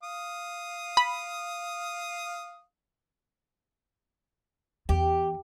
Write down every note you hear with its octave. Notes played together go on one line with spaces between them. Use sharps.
F5 D#6
B5
E2 G4